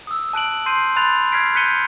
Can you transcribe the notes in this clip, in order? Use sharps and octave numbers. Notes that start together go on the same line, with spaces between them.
D#6 E6
A5 F#6 D7 F#7
C6 G6 C7 D#7
B5 C6 F#6 A6 F7
F6 G#6 B6 C7 D7
F#6 G6 B6 C#7 D#7 G7